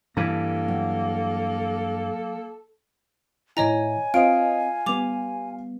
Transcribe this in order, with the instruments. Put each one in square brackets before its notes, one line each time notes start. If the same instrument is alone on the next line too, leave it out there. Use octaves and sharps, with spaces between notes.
[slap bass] G2 E3 [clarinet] A#3 [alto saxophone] A4 [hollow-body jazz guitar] A#5
[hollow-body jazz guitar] F#3
[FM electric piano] A2 D#3 E4 [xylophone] C#5 D#5 A#5 [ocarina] G#5
[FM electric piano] C4 C5 D#5 [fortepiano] F4 [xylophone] D7
[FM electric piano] G3 B3 [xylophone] D6 F7